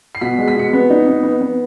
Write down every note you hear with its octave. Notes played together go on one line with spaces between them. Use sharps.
C7
B2 B6
G#3
B6
B2 C#7
B3
D#4
B3
B3
B3